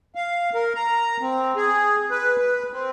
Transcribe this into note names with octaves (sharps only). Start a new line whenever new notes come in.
F5
A#4
A#5
C4
G#4
B4
B4
C4